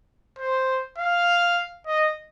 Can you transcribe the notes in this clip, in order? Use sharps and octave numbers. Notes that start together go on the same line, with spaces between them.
C5
F5
D#5